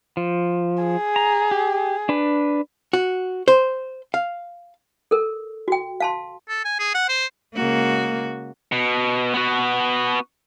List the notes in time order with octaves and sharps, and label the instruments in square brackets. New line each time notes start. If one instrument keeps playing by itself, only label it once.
[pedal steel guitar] F3
[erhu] G#4
[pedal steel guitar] A#5
G4
D4 B4
[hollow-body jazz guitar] F#4
C5
F5
[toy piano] A4 A#4
F#4 G5
F5 A5 C6
[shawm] A4
G#5
G#4
F#5
C5
[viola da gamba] C#3 G#3 F#4 [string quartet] A#3
[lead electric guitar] B2
B3 F#4